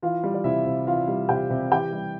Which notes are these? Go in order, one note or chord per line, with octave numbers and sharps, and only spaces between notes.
E3 F4 F5
G3
D5
C3 E4 E5
C3
E3 F4 F5
G3
C3 G4 G5
C3
E3 G4 G5
G3